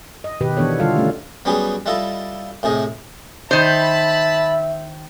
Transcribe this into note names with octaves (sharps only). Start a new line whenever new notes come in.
D#5
B2 D#3 G4 B4
E3 B3 D4 A4 C#5
D3 G3 F4 A4 F5
A3 C#4
F#3 G3 B3 C#4 G4 G#4
G3 E4 F4 A4 D#5
A2 C3 G#4 D#5
D#3 C5 E5 A5 B5